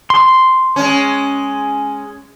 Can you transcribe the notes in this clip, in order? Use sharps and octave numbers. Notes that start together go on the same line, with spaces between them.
C6
G#3 C#4